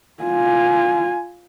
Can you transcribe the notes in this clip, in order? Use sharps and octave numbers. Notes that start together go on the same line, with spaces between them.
F4 G#5